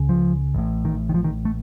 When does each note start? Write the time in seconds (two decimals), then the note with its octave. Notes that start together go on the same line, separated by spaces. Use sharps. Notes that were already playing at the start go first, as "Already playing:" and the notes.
Already playing: C#2 C#3
0.09 F3
0.54 A1 A2
0.85 D#3
1.09 D#3
1.14 F3
1.24 D#3
1.45 A3